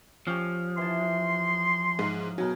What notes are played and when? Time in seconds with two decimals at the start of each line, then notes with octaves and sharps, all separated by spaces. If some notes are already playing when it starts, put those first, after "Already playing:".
0.27 F3 C#4 G4
0.78 E3 A5 C6
1.99 G#2 D#5 F5 A#5
2.38 B2 F#3 G#4 A#4 G5